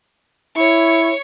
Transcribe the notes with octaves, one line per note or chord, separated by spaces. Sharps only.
E4 C#5 C#6